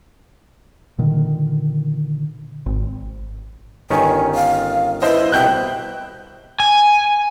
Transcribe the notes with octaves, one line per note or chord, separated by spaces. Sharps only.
A#2 D3 D#3
G#1
G1 D#3 C#4 G#5
F5
E4 B4 C5 D#5
C2 B2 E5 G5 F#6 G6
G#5